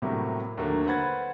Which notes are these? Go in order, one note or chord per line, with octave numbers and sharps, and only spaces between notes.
A2 C3 F#3 G3 A3 A#3
D#2 D3 F#3 A3 A#3
B4 C5 F#5 B5 G#6 A6